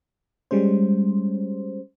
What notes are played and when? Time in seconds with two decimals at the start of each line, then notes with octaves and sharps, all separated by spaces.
0.51 G3 G#3 C#4 C5